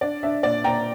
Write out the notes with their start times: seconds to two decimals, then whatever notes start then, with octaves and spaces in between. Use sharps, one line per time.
0.01 D4 D5
0.23 D4 E5
0.43 A#2 D5
0.64 A#2 G5 A#5